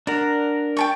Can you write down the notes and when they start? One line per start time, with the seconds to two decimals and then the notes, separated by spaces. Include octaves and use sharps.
0.07 D4 A#4 F#5
0.77 G5 A5 C#6